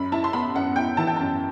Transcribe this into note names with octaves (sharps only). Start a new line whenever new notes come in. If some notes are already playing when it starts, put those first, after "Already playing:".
Already playing: F#2 B5
E4 A5
C6
B3 B5
F#2 F#5
E4 G5
E3 A5
G5
F#2 A5